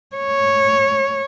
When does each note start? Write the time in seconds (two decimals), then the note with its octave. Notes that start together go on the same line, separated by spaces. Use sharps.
0.16 C#5